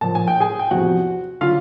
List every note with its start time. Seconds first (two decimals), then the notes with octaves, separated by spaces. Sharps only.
0.01 A#2 F3 A5
0.15 G#5
0.28 G5
0.40 G#4 G#5
0.59 G5
0.71 E2 C3 F3 F#4 F#5
1.41 D3 F#3 F4 F5